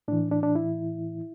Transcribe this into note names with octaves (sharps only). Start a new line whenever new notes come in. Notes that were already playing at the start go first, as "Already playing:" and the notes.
A2 E3 D4
D4
D4
E4